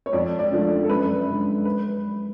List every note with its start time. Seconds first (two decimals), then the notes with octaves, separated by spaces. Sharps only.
0.06 C#5
0.13 F2 D5
0.39 D5
0.52 D3 F3 A3
0.84 A4
0.90 F#2 B4
1.28 D3 G#3
1.65 B4